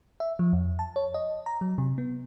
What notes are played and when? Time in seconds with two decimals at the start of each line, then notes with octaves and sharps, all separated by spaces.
0.20 E5
0.39 F3
0.53 F2
0.79 A5
0.96 C#5
1.14 D#5
1.46 A#5
1.61 F#3
1.78 C3
1.98 B3